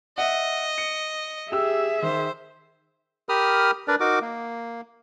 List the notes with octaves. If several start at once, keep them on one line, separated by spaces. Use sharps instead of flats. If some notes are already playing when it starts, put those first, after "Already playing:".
D#5 E5 F#5
C#7
G4 G#4 E5 E6
D#3 C5
G4 A#4 B5 D#6 F6
D4 A#4 B4 D5
D#4 F#4 A#4 D6
A#3